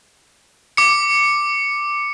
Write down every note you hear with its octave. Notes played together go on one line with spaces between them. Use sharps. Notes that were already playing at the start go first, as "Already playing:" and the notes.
D6 C#7